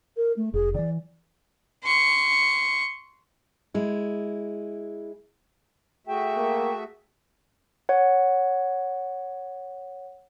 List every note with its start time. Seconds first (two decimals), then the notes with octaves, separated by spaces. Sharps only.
0.17 A#4
0.36 A3
0.54 F1 G#4
0.74 D#3 E3 D5
1.84 C6 C#6
3.74 G#3 E4
6.07 A3 F#4 G#4 E5 G5
6.37 A#3
7.89 C#5 F#5